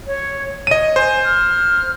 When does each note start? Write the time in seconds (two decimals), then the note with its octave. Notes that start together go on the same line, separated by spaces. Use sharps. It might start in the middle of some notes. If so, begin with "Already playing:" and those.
0.07 C#5
0.67 C#5 D#5 D#7
0.96 C5 G#5
1.24 F6